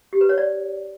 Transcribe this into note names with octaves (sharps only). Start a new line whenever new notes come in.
G4
B4
C#5
D5